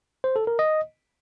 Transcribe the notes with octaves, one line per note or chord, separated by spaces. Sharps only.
C5
A4
A#4
D#5